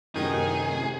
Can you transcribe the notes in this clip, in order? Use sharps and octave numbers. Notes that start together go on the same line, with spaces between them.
F#2 A2 C3 D#3 B3 D#4 G#4